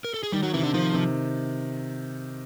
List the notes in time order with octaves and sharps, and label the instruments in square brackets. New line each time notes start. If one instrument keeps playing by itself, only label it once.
[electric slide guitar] A#4
A4
G#4
[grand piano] D#3 [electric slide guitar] G3 G4
[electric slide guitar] F#3 F#4
[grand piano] C3 [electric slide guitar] E3 E4
[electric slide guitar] D3 D4
[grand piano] D#3 [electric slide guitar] F3 F4
[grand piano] C3